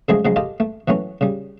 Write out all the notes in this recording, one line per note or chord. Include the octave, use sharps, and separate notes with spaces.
C#3 F3 F#3 G#3 A3 G#4
C#3 F3 F#3 G#3
F4 G4 A4 D#5
A3
E3 F#3 A3 C#4
C#3 G3